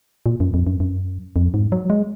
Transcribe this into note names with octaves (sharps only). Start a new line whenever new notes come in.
A#2
F#2
F2
F#2
F#2
F2
G#2
F#3
G#3